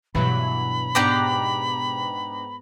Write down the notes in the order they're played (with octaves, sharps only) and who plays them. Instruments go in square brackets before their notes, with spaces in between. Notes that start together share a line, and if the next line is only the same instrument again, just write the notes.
[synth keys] G2 E3 F#3 [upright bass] B2 [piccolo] B5
[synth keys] G#2 B3 A#5 [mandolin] D4 G4 D5